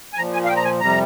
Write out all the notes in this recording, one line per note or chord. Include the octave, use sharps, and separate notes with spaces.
G#5
A#2 F3 A#5
G#5
F5
G5
A#5
G#5
F2 C3 G3 A#5